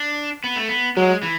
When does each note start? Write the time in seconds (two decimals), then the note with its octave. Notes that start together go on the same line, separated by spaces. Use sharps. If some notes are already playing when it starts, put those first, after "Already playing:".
Already playing: D4
0.44 B3
0.56 A3
0.68 B3
0.97 F#3 G#3
1.23 E3